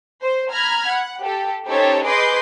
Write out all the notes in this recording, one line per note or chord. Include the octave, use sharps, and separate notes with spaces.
C5
A#5 B5 F6 G#6
F#5
G4 A4
C#4 D#4 G4 A4 C5 C#5
G#4 B4 D#5 C6 D6 G6